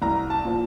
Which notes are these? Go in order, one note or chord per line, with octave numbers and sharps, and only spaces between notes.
C2 A#5
A5
A#2 F3